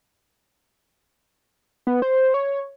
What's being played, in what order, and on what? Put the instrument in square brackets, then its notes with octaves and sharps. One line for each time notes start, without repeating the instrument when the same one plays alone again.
[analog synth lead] B3
C5
C#5